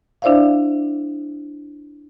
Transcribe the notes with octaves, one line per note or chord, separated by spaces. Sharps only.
D4 E4 C5 D5 E5 F5